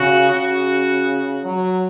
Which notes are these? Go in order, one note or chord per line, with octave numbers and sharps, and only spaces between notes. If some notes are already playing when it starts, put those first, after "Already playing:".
Already playing: C#3 F#4
C#3 F#4
F#3